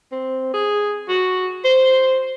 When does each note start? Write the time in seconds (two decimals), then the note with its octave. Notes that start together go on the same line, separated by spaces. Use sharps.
0.12 C4
0.54 G#4
1.09 F#4
1.64 C5